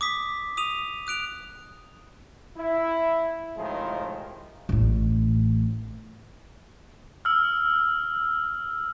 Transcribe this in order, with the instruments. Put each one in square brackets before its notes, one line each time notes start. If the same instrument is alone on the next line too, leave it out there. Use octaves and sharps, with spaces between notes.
[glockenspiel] D6 D#6 B6
D#6 D#7 F7
D#6 F#6 D7 F7
[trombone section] E4
A2 C3 D#3 F3 G#3
[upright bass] A1 A2
[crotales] E6 F6